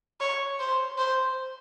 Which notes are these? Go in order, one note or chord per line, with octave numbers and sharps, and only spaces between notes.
C#5
C5
C5